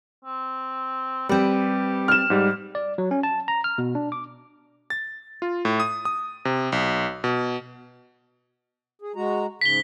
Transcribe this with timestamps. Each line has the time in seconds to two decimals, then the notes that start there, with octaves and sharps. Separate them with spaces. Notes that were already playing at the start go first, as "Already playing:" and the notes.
0.25 C4
1.29 G3 C4 G4 B4
2.08 F6 E7
2.30 G#2 G3
2.75 D5
2.98 F#3
3.11 C#4
3.23 A5
3.48 A#5
3.64 F6
3.78 B2
3.95 D4
4.12 D6
4.90 A6
5.42 F4
5.65 A2
5.80 D#6
6.05 D#6
6.45 C3
6.72 B1
7.24 B2
9.02 G#4
9.15 G#3 F#4 A#5
9.61 G#2 C#3 B6 G7